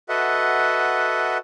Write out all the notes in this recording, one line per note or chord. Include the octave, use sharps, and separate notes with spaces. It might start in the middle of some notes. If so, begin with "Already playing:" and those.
F#4 A4 B4 D#5 E5 F#5